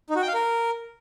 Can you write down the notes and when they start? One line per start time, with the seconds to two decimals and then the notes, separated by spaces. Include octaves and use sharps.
0.10 D#4
0.16 F#4
0.22 G5
0.28 F5
0.34 A#4